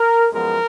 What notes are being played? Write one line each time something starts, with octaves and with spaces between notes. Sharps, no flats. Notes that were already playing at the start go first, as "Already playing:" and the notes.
Already playing: A#4
F#2 F3 G#3 B3 A#4